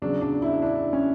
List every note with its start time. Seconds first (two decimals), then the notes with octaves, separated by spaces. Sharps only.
0.02 E2 C#3 F#3 D4
0.21 D4
0.42 E4
0.62 D4
0.93 C#4